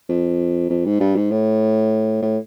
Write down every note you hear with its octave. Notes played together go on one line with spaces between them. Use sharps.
F2
F2
G#2
G2
G#2
A2
A2